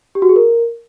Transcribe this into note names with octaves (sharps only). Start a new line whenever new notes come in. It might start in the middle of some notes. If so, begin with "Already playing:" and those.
G4
F#4
G#4
A#4